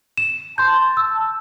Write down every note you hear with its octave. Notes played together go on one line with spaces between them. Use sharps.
E7
A5 C6 G6
E6